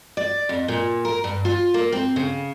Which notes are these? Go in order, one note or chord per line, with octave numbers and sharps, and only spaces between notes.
D5
F2
A#2
A#4
G2
F4
A#3
C4
C#3